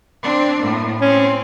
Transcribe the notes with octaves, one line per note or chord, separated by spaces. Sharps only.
C4 D4
A2 A#3
C4 C#4